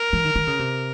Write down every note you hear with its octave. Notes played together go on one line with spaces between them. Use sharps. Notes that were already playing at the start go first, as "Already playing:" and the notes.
Already playing: A#4
E3
D#3
D#3
C#3
C3